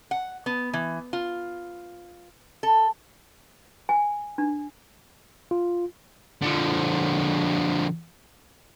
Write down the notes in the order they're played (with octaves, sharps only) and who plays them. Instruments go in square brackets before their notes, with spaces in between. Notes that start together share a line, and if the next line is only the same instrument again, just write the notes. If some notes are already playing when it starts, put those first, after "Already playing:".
[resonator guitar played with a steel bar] F#5
B3
E3
F4
A4
[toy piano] G#5
D4
[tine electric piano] F4
[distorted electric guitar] D3 F3